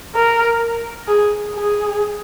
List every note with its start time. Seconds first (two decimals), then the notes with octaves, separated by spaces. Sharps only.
0.15 A#4
1.08 G#4
1.55 G#4